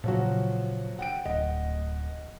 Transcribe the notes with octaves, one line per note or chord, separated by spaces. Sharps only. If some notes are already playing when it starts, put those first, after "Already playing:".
A#2 C#3 F3 F#3 F#4
F#5 G5 D7
D1 D#5 F#5